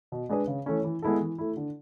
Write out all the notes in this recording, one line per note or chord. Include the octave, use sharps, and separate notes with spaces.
B2
G#3 D4 G#4 B4
C#3
E3 A3 C#4
E3
G#3 B3 E4 A4
E3
A3 E4
D3